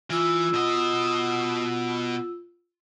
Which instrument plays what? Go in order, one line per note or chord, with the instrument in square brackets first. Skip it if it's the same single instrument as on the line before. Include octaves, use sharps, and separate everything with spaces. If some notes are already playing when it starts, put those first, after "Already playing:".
[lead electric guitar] E3 [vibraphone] F4 E6
[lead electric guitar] B2 D#5